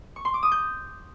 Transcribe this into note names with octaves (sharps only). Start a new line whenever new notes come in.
C#6
C6
D6
D#6
G6